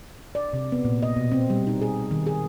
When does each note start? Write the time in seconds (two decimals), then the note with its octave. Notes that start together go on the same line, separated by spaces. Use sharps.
0.35 D5
0.53 C3
0.72 B3
0.85 A#2
1.03 D#5
1.16 B2
1.32 C4
1.50 G3
1.67 D#4
1.81 G#4
2.11 D#3
2.26 G#4